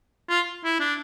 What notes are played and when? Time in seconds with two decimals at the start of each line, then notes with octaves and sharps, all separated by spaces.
0.29 F4
0.64 E4
0.80 D4